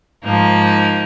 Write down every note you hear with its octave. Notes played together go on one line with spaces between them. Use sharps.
G#2 F3 A#3 D#4